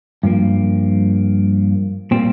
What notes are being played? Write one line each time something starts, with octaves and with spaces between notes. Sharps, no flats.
G2 F3 A#3
A#2 G3 A#3 C4